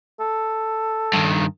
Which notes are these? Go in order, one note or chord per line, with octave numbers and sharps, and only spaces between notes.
A4
G2 D#3